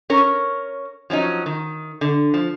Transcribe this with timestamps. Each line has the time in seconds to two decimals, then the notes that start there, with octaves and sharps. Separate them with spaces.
0.10 C#4 A#4 C#5
1.10 F3 F#3 C#4 D#4
1.46 D#3
2.01 D3
2.34 F3